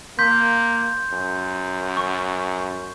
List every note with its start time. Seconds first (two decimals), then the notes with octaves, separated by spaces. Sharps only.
0.19 A#3 C6 G6 B6
1.12 F#2
1.97 C#6